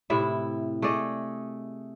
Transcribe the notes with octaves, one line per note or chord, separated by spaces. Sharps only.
A2 C3 E4 E5
A3 G#4 D5 D#5